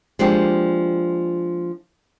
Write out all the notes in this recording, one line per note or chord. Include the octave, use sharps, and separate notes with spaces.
F3 G#3 A#3 D4 G4